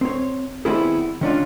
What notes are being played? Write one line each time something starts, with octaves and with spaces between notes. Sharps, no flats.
C4 C#5
D#3 G3 B3 C4 E4 G#4
D#3 C#4 D4 F4